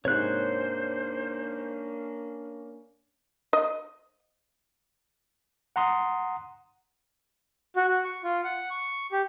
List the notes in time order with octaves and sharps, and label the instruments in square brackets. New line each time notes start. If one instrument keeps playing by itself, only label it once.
[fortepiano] G#2 C3 [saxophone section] A#3 C#4 D4 [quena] C5 [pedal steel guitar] C#5 F#6
[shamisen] D#5
[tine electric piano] F#5 A#5 C6 D#6
[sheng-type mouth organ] F#4
F#4
C#6
F4
F#5
C#6
G4